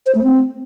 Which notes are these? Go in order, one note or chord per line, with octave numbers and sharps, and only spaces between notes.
C5
A3
C4